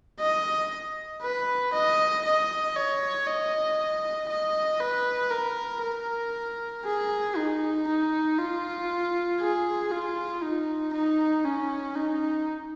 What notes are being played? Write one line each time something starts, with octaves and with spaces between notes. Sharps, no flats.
D#5
B4
D#5
D#5
C#5
D#5
D#5
B4
A#4
A#4
G#4
D#4
D#4
F4
G#4
F4
D#4
D#4
C#4
D#4